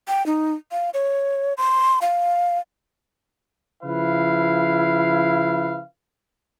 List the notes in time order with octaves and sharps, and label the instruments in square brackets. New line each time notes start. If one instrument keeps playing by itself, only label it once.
[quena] G5
D#4
F5
C#5
C6
F5
[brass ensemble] C#3 F3 E4 B4 F5